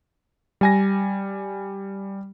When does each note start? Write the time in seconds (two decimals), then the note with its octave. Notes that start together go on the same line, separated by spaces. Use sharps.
0.61 G3 G#5 A#6